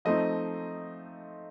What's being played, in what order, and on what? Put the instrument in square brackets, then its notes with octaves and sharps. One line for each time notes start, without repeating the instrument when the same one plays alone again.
[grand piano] F3 A3 C4 D#4 D#5